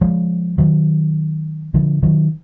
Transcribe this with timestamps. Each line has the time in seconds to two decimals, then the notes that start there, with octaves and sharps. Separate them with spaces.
0.01 F3 G#3
0.58 D#3 F#3
1.74 D3 F3
2.03 D#3 F#3